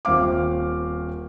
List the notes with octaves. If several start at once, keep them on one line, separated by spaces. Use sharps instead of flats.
D#1 C4 F5 D6